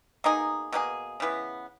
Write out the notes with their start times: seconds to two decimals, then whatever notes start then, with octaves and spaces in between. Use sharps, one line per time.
0.24 B2 A#3 D#4 G#4
0.72 B2 A#3 D#4 G#4
1.20 C#3 E3 B3